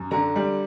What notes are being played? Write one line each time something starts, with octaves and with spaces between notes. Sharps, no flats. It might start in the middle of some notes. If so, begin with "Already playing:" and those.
Already playing: F#2
D3 A#5
G3